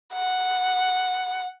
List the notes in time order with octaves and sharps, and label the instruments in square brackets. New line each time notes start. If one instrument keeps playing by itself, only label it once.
[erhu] F#5